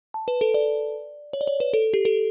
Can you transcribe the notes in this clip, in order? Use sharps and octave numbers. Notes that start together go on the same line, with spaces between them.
A5
B4
A4
D5
C#5
D5
C#5
B4
A4
G4
A4